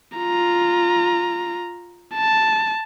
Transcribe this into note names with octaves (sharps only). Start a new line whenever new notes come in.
F4 A#5
A5